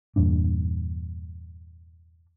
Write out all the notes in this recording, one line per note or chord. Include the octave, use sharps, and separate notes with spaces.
E2 G2 A#2 D4